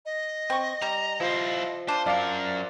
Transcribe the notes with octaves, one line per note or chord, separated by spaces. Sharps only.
D#5
C4 C#6
G3 A#5
F3 E4 C5
D4 F4 C5
F#2 A#4 D5 F5